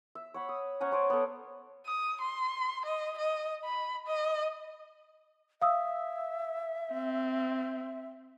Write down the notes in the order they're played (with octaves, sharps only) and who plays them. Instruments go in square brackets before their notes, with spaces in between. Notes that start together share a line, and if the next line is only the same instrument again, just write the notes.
[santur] E5
C#5 F#5 B5
D#6
C#4 F#5 G#5 A#5
C#4 C5 D5 G#5
B3 A4
[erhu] D#6
C6
D#5
D#5
B5
D#5
[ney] E5 [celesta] F5 D#6 E6
[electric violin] C4